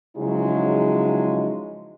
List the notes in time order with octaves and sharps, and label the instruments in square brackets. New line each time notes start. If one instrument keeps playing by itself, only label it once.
[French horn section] C#3 F3 F#3 G#3 D#4 E4